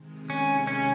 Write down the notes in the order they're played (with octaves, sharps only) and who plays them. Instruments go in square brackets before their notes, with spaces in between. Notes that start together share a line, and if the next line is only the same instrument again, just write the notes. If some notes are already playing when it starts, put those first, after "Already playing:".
Already playing: [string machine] C3 D#3 G#3
[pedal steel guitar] C#4
C#4